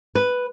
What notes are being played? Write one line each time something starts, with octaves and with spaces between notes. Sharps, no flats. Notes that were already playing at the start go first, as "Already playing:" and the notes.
B4